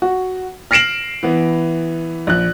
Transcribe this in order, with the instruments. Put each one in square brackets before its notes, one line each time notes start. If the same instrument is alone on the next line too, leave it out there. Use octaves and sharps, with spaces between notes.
[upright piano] F#4
F6 A#6 C7 D7 E7 F#7
E3 B3
A#1 F#6